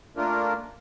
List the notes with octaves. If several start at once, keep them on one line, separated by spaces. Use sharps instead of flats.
A3 A#3 D4 F4 A#4